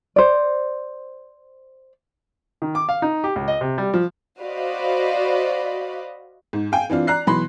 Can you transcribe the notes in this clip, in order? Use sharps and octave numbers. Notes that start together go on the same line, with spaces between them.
C5 D5
D#3
D6
F5
D#4
G4
C#2
D#5
C3
G3
F3
F#4 C5 D5 D#5 F5 B5
G#2
F5 G5 G#5
E3 C4 D4 F4
D5 A#5 F#6 C7
B2 E3 F#3 B5 C6